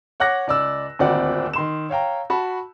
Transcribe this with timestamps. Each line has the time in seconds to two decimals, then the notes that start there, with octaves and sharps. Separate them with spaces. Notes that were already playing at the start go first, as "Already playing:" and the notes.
0.20 C#5 F#5 D6 F#6 A#6
0.47 C#2 D5 E6
0.99 D#1 G#1 D2 C4 D5 F#5
1.54 D#3 C6 E7
1.90 C#5 F5 G5 A#5
2.30 F#4 A5 B5